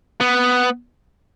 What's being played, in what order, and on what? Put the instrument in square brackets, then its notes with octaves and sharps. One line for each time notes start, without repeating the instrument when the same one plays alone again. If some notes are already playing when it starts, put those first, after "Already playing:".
[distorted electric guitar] B3